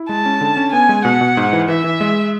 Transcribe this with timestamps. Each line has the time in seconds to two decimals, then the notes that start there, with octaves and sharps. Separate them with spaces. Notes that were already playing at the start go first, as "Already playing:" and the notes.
Already playing: E4
0.09 G#3 A5
0.26 C#4
0.41 D3
0.57 C#4
0.72 B3 G#5
0.89 G#3
1.04 B2 F#5
1.21 B2
1.37 G#2
1.53 E3
1.68 E3 E5
1.84 E3
2.01 G#3